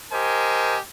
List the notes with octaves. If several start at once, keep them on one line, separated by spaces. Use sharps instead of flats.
G4 A#4 C5 D#5 G#5